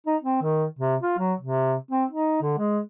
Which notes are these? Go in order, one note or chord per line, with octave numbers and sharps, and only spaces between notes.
D#4
C4
D#3
C3
F4
F#3
C3
C4
D#4
D3
G#3